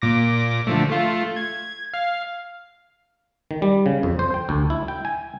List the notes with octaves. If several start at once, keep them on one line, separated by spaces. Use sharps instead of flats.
A#2 D6 A#6
D3 F3 A3
A3 F4
G#6
F5
D#3
G3
C#3
F2
C5
G5
D2
E4
G5
G#5